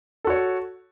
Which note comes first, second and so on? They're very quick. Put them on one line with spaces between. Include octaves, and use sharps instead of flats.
A4 F#4 C#5